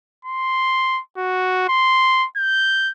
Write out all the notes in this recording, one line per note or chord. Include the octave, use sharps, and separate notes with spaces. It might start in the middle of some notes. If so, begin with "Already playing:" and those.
C6
F#4
C6
G6